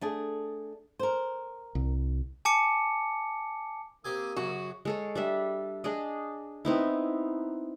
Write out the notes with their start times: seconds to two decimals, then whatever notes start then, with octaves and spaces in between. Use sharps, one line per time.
0.01 A3 D4 G#4
0.99 A#4 C5
1.75 C2
2.45 G#5 A5 D6 C#7
4.05 A#3 C4 G4 G#5 D#6 E6
4.37 F#2 C#3 F#4
4.85 G#3 A4 C#5
5.15 G3 D4 E5
5.84 D4 G#4 D5 D#5
6.65 B3 C4 D#4 E4